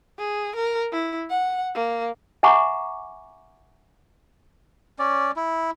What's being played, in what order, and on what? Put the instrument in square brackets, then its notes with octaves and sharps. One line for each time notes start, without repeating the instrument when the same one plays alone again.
[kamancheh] G#4
A#4
E4
F#5
A#3
[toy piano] E5 F#5 G#5 A#5 C#6 D6
[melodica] C#4 D5
E4